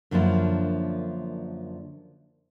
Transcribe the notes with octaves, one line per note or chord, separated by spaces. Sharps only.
F#2 D3 F3 A#3 D4 E4